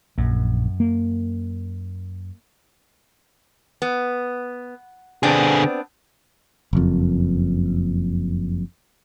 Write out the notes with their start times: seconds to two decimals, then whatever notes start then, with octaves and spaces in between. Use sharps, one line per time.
0.18 A#1 F#2
0.80 A#3
3.82 B3
5.23 D3 B3 C4 D4 G#4
6.73 F#1 F2